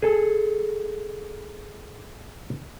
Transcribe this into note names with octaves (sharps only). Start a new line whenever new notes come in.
G#4 A4